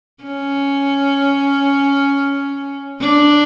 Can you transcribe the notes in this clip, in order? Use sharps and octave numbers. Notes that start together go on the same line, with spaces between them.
C#4
D4